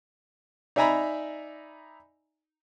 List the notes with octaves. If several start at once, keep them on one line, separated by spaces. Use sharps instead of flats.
D#4 D5 E5 G#5 A#5 B5